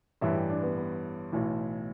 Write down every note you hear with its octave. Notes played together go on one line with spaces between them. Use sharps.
A1 G2 E3 E5
G4
D4
B3
B3
B1 A2 E3